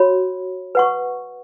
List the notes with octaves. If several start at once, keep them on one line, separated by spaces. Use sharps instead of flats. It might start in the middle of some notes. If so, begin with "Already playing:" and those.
Already playing: F#4 C#5 B5
B4 F#5 C#6